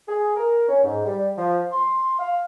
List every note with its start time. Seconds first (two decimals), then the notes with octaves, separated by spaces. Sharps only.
0.08 G#4
0.36 A#4
0.68 C#4
0.84 G#2
1.05 G3
1.38 F3
1.72 C6
2.19 F5